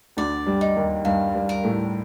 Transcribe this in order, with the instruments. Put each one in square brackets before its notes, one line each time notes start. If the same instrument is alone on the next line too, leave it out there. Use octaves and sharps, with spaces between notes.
[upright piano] D2 D3 [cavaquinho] D5
[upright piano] G2 G3
[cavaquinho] D#4
[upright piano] D#2 D#3
[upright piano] G2 G3 [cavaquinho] F5
[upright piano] G2 G3
[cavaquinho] A#4
[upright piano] A2 A3